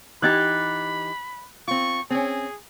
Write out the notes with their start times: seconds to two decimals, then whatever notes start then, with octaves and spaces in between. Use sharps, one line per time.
0.22 E3 D#4 G4 B5 F#6 G#6 A6
1.68 C4 F4 C#6
2.10 C4 C#4 G#4